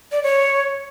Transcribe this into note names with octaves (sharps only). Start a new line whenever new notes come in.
D5
C#5